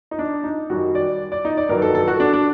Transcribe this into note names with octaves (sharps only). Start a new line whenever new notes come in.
D#4
D4
D#4
F#2 D#3 G3 F#4
D5
D5
D#4
D5
G2 D#3 F#3 A#4
A4
A4
F#4
D4
D4